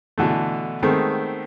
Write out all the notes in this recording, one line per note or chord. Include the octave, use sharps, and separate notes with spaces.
B2 D3 E3 A3
D#3 G#3 A3 B3 C4